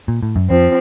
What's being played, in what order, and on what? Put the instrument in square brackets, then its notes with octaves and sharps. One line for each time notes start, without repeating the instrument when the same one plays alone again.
[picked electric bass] A#2
A2
F#2
[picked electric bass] F2 [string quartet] F3 C4